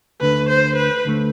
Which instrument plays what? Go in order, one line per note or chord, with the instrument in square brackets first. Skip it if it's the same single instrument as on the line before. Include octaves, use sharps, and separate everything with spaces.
[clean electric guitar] D2 D3 A3 [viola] B4
[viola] C5
B4
[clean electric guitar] D2 D3 A3